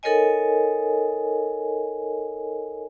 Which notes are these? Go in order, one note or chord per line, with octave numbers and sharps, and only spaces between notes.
D#4 A4 A#4 C#5 D#5 G#5